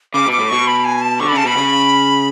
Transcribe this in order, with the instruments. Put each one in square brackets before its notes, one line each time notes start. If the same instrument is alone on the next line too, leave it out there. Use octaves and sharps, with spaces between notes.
[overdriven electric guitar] C#3 [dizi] D6
[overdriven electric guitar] B2
[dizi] D6
[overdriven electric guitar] A2
[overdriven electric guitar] B2 [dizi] C#6
[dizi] B5
G#5
A5
[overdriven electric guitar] D3 [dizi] C#6
[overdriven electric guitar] C#3 [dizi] B5
[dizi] A5
[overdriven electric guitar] B2 [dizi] B5
[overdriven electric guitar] C#3